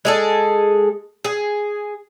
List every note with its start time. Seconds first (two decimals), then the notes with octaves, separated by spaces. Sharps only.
0.05 G#3 G#4 A4
1.24 G#4